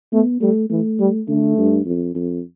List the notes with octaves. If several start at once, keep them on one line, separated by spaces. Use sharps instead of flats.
A3 B3
G3 A3
E3 A3
G3
D3 A3
G2
F2
F2